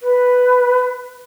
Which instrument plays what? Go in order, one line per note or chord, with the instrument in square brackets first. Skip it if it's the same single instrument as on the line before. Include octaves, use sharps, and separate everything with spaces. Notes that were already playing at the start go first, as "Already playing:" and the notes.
[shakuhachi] B4